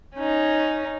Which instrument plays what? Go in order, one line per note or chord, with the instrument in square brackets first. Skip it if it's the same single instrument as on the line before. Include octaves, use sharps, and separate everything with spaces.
[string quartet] C#4 D#4